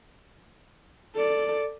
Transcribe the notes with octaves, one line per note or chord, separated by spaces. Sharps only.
A4 D5